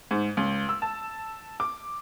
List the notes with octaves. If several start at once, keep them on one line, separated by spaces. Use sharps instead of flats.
G#2
C#2
E6
A5
D6